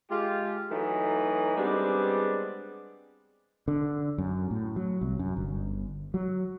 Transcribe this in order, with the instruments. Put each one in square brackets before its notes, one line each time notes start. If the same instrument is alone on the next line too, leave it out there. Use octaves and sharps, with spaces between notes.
[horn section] G#3 F4 G4
E3 F#3 A3 D#4
G3 G#3 B3 C4 D4 G#4
[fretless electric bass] D3
F#2
A2
F#3
C2
F#2
G1
F#3